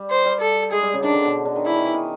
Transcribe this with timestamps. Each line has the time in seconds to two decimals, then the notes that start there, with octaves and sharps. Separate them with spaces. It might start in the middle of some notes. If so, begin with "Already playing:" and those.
Already playing: G3
0.10 C5
0.25 G3
0.41 A4
0.72 G#3 G#4
0.83 G3
0.93 C#3
1.04 D#3 D4
1.14 D3
1.25 B2
1.45 D3
1.56 D#3
1.66 E3 E4
1.76 D#3
1.85 E3
1.94 D#3